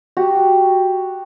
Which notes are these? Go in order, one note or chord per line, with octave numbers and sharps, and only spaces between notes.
F#4 G4